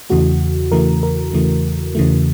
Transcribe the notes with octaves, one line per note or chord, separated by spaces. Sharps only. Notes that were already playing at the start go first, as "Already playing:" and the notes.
E2 C#3 E3 A3 F#4
E2 C#3 E3 A3 A#4
A#4
E2 C#3 E3 A3
E2 C#3 E3 A3